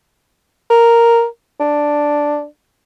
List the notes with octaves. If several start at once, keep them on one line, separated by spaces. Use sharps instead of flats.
A#4
D4